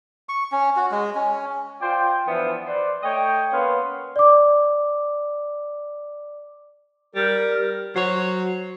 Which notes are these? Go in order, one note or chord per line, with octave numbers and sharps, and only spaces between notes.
C#6
C#4
F#4
G#3
C#4
F4 C5 D5 G5
E3 F3 B3 D4 E4
B4 C5 D5
A3 C#5 D#5 G5
A#3 B3 C#4 B4 F5 C6
D5 D6
G3 A#4
F#3 C5 C#5